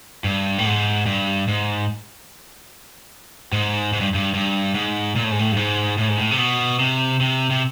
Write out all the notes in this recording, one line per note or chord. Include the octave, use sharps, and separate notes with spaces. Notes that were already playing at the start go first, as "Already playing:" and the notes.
G2
A2
G#2
G2
G#2
G#2
G#2
G2
G2
G2
G#2
A#2
A2
G#2
A2
G2
G#2
A2
G#2
A2
C3
B2
C3
C3
C3